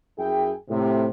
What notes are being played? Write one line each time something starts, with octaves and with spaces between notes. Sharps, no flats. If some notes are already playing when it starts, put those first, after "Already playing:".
F#2 E4 G#4 G5
A2 C3